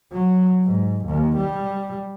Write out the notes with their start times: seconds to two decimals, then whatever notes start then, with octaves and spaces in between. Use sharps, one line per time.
0.12 F#3
0.64 G#2
1.06 D#2
1.37 G3